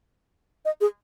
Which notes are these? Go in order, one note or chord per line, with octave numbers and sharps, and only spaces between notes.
D#5
G#4